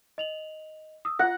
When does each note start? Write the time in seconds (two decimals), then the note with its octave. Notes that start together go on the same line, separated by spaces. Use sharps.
0.18 D#5 F7 F#7
1.05 D#6 E6
1.19 F4 F#5 A#6